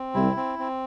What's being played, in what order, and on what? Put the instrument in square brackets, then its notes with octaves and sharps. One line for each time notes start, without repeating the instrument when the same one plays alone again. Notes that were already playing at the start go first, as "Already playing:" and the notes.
Already playing: [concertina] C4
[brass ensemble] C2 C3 [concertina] E4
[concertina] C4
C4